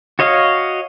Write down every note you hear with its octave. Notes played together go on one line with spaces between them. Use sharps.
F#4 C#5 D#5 F5